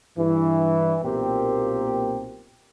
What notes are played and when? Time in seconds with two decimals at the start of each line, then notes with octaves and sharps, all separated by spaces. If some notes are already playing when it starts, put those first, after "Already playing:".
0.18 G2 E3
1.04 B1 A#2 A#3 C4 G4 A#4